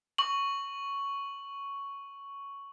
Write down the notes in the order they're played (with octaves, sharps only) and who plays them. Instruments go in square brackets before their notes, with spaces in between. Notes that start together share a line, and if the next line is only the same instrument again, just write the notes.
[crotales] C#6 F#7